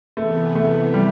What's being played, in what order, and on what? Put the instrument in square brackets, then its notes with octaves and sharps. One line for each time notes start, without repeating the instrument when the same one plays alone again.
[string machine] C3 E3 B3 [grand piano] A3
[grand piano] A3
G3